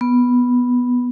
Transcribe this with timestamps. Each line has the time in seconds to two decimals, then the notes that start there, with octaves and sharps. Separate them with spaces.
0.01 B3